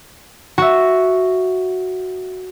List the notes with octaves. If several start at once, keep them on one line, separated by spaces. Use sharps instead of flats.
F#4 E5